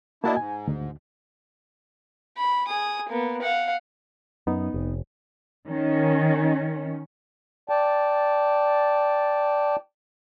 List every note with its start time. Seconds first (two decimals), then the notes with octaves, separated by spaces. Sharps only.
0.24 A#3 D4 E4 F#4 D#5 A5
0.37 G#2 G#5
0.67 D2
2.37 B5
2.67 G#4 D#6
3.09 A#3 B3
3.42 F5 F#5
4.47 F#2 B3 D#4
4.74 F1
5.67 D#3 C#4
7.69 D5 G5 A5